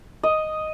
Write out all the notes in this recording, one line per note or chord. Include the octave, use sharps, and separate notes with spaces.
D#5